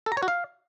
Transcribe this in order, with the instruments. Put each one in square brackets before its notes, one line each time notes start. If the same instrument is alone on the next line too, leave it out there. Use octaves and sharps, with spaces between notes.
[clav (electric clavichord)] A4
A#5
C#5
F#4
F5